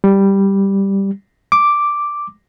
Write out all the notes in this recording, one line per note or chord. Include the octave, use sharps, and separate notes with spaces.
G3
D6